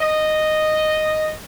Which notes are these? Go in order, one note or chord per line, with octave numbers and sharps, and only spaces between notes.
D#5